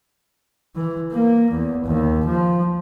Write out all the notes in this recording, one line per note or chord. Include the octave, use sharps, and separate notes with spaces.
E3
A#3
E2
D#2
F3